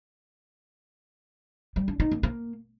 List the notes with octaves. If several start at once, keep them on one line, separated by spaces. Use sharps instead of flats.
G3
D4
D#4
A#3
A#3